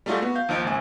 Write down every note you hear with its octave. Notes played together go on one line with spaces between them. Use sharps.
G3 A3 D#4 F4 F#4 G#4
B3 F#4
F5 G6
D#2 F3 D#4 D7
G#1 C#2 G#5